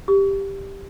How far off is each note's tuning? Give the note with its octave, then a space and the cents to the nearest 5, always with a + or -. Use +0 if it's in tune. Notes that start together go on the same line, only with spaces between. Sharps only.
G4 +5